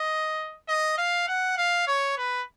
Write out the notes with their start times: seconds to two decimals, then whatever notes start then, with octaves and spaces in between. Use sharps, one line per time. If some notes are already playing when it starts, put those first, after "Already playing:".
Already playing: D#5
0.68 D#5
0.98 F5
1.28 F#5
1.57 F5
1.87 C#5
2.17 B4